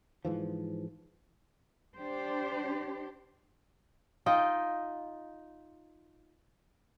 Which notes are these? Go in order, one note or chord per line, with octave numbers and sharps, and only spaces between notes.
G#2 E3 F3
D4 G4 C5
D#4 F4 D#5 G5